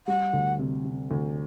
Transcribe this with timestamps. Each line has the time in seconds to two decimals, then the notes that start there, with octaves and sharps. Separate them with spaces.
0.07 G3 F#5
0.33 D2
0.59 C3
0.85 C3
1.11 D2